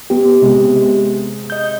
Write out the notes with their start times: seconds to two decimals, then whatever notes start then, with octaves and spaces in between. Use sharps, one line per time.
0.10 B3 G4
0.42 C3 G#3
1.50 D#5 G6